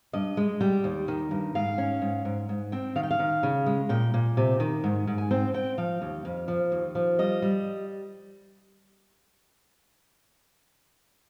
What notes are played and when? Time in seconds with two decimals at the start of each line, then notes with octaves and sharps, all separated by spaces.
0.13 G2 D#5
0.37 G#3
0.61 G3 G5
0.84 D#2
1.08 D#3
1.31 G2
1.55 G#2 F5
1.78 C#4
2.02 G#2
2.25 G#2
2.49 G#2
2.72 C4 G5
2.96 D#3 F5
3.03 G5
3.11 F5
3.19 D#3
3.43 C#3
3.66 G#3
3.89 A#2 G5
4.14 A#2
4.37 C3
4.60 D#3
4.84 G#2
5.07 G#2
5.18 G#5
5.31 C4 G5
5.54 C4 G5
5.78 F3 F5
6.02 D#2
6.25 F2
6.48 F3
6.72 D#2
6.95 F3
7.19 G3 D#5
7.42 G3